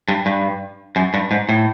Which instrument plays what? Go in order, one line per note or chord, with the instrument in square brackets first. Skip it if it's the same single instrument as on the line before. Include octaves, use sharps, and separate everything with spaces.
[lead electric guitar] G2
G2
F#2
G2
G#2
A2